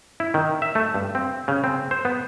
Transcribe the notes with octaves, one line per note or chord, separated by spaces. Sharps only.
E4
D#3
E5
A3
G2
C4
C#3
C4
C5
B3